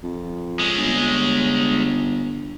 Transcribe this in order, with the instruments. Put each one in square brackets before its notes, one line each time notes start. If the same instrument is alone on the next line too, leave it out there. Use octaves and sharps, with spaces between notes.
[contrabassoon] F2
[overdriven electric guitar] G#3 C#4
[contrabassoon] G1